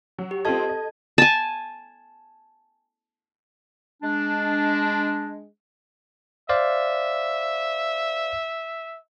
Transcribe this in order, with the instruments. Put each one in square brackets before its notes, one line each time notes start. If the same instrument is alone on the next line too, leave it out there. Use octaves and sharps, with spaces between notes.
[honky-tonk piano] F#3
[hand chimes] G4
[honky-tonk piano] C4 F4 D#5 [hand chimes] A4 A5 G#6
[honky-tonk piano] D#5
[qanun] G#5 A5
[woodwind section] G#3 D4
[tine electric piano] C5 D5 F5 [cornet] E5